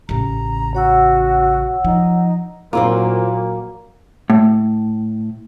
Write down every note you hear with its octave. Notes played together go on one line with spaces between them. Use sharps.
A1 C#3 A#5
F#4 C#5 F#5 E6
F3 D#4
A#2 F#3 A#3 C4 E4 F4
A2